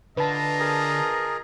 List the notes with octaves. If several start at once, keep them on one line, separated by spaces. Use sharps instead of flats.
D3 D4 F4 B4 D#5 A5 A#5
G#4 A#4